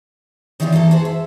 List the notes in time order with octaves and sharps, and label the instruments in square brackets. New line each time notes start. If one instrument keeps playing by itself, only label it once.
[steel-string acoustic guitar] D#3 E3 F#3 G3 C4 F4
E3 A#3 G4 A4 A#4
F#4 G#4 A4 C5
E5